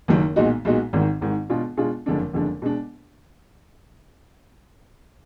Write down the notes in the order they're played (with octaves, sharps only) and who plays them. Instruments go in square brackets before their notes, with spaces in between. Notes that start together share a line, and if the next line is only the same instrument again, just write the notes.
[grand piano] F#1 F#2 D#3
B1 A#2 G#3 D#4 F#4
B1 A#2 G#3 D#4 F#4
G#1 G#2 D#3
G#1 G#2 D#3
B2 G#3 D4 F4 G#4
B2 G#3 D4 F4 G#4
F#1 F2 D3 G#3 D4
F#1 F2 D3 G#3 D4
B2 G#3 D4